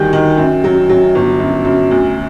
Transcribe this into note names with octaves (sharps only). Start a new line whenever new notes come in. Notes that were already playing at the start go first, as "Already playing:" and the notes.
Already playing: D2 D#3 G3 G6
D#3
F#2
F#3
F#3
G1
F#2
F#2
D2